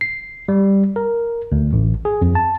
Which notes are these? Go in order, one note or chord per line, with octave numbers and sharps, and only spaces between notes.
C7
G3
A#4
D2
A1
G#4
F2
A5